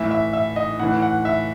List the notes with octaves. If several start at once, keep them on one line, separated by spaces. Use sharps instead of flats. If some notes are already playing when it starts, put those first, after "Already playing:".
Already playing: A2 E3 E5
E5
E5
D#5
A2 E3 F#5
F#5
E5